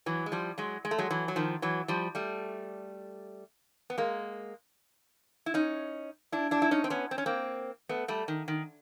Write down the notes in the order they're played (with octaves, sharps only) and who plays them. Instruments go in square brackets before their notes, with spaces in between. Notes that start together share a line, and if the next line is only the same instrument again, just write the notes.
[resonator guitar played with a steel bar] E3 F#3
G#3
F3 G3
F#3 G#3
G#3
A3
F#3 G#3
E3 F#3
F#3
D#3 F3
E3 F#3
F3 G3
G3 A3
B3
G#3 A#3
E4
C#4 D#4
D4 E4
D4 E4
E4
C#4 D#4
C4
B3 C#4
C4
C#4
A#3 C4
A3 B3
G3 A3
D#3
D#3